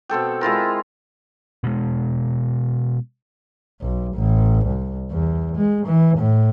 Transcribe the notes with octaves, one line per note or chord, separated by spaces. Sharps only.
B2 C4 A4 G5
G#3 E4 F4 A#4
B2 G#3
B1
A1
C2
E2
G#3
E3
A2